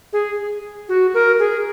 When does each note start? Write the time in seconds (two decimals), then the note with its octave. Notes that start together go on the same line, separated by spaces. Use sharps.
0.13 G#4
0.89 F#4
1.14 A#4
1.39 G#4